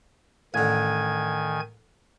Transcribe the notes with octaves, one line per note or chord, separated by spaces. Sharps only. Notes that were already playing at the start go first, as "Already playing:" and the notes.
A1 D3 D#3 G#5 G#6